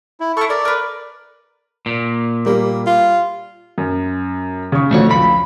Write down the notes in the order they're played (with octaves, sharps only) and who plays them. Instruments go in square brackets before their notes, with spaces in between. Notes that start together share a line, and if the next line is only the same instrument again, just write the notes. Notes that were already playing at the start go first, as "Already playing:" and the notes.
[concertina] E4
[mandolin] E4 F6 [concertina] A4 C#6
[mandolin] A#4 [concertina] D5
[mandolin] A#4 B4
[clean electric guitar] A#2
[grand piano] G3 [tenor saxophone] A#3
[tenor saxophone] F4
[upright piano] F#2
C#3 C#6
[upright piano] F2 D3 [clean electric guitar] A3 F#4 C#5
[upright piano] C#2 [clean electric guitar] F3 B5